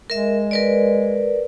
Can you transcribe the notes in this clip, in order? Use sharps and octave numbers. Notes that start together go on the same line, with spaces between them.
G#3 A#4 E5
A#4 B4 D5